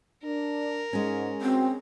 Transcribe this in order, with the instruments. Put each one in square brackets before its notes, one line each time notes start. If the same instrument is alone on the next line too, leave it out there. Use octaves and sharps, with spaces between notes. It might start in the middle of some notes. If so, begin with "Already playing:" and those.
[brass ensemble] D4 [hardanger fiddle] A#4
[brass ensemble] G#2 [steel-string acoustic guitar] G#3 C#4
[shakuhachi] C4 [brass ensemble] F#4